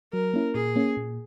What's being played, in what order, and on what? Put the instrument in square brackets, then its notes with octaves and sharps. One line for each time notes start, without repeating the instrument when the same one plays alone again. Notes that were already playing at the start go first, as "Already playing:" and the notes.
[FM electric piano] F#3 [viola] A#4
[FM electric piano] A#3 C#4 E4
[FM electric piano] A#2 [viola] G#4
[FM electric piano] A#3 C#4
A#2